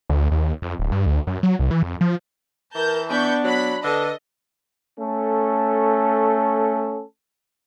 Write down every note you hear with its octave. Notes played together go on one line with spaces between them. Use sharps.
D2
D#2
F2
D1
G2
D2
F#2
F#3
C2
E3
F2
F3
E3 A#4 A5 A#5 G6
B3 D4 B5 C#6 G6
F#3 B5 F#6
D3 A4 B4 D#5
A3 C#4 A4